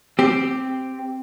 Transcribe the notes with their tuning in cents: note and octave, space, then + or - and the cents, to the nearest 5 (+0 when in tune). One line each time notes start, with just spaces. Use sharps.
C4 +0 G4 +0